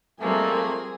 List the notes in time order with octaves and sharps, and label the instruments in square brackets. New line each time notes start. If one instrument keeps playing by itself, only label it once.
[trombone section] F2 A3 [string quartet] G3 A#3 C4 [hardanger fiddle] G#4